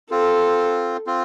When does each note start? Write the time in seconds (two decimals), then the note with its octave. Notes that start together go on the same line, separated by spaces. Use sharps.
0.11 C4 F4 A4
1.07 C4 F4